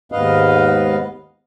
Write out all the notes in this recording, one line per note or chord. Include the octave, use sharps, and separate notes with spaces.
D#2 G#2 B3 B4 D#5 F5